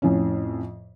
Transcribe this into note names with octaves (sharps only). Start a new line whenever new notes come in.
F2 A2 C#4